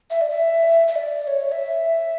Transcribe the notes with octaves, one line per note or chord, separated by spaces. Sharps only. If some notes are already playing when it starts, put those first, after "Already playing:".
E5
D5
E5
E5
D5
D5
C#5
E5